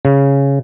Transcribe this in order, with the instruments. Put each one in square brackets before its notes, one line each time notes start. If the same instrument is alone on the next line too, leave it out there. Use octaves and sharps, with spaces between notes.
[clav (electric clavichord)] C#3